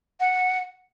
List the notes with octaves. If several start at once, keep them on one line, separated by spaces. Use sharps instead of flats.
F#5